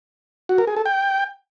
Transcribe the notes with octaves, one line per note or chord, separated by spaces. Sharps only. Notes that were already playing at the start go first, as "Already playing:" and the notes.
F#4
A#4
G#4
A4
G5